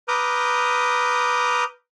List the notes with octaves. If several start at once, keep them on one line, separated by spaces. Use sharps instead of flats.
B4 A#5 D6 D#6 F6 G6